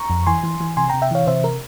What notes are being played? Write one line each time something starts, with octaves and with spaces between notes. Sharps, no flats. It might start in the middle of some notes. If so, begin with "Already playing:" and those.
Already playing: A#5 C#6
F2
E3 G#5 C6
E3
E3
C3 G#5 C6
C3 G5 A#5
E5 G5
E3 C#5 F5
C3 C5 E5
A#4